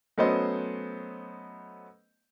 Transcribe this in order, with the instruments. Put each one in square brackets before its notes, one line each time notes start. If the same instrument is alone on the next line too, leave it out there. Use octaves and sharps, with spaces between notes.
[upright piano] F#3 A3 B3 C#4 C5 D#5